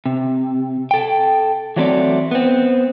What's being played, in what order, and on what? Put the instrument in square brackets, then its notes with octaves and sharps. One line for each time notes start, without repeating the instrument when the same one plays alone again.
[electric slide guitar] C3
A4 G5
E3 F#3 A3 C4 D5
B3 C4